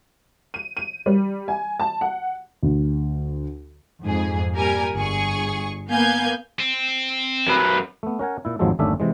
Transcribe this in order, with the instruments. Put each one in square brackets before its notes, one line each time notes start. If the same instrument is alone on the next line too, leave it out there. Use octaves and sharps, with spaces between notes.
[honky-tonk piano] D#7
D#7
G3
G#5
A5
F#5
[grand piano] D2
[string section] F2 G#2 G#4
A#2 G3 A#4 G#5
G1 G#4 C#6
A#3 B3 F5 G#5 G6 G#6
[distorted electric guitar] C4
[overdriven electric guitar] F#2 B4
[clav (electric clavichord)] A3 B3
C#4 A#4 F#5 G#5
A#2 E4
G#1 D#2 F3 F#3 G#3 A4
G1 D#2 A3 C#4 D4 E5
C3 E3 G#3